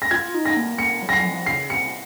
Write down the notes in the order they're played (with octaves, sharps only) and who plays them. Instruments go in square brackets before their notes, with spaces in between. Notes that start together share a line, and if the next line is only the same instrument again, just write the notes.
[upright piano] A#6
[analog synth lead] F4 [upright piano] G#6
[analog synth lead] D#4
[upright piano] A#6
[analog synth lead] A#3
[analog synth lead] A#3 [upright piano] C#7
[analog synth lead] F#3
[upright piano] A#6
C7
[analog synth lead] F3
[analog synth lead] C#3 [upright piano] C7
[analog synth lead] C3 [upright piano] C#7